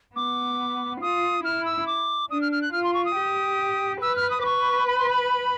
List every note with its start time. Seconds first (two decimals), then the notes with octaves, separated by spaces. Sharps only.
0.15 B3 D6
1.01 F4 D#6
1.44 E4 F6
1.65 E6
1.87 D6
2.30 D4 D#6
2.41 F6
2.52 F6
2.62 F#6
2.72 F4 F6
2.84 C6
2.94 C#6
3.05 D#6
3.16 G4
4.02 B4 E6
4.16 F6
4.30 D#6
4.41 D6
4.45 B4 C#6
4.87 B5
4.98 C6
5.10 B5